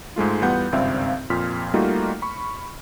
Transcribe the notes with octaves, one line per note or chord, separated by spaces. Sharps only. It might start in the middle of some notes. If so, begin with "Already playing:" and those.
G#2 G#3 A3 F4
E2 G3 B3 F4 F#5 G6
G#1 C#2 G2 C4 E5 F5
F2 A#2 C6 F6 B6
G3 A3 A#3 D#4 F4 F#4
B5 C#6